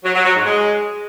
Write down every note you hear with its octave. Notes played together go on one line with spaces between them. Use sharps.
F#3
F#3
F#3
G#2
G#3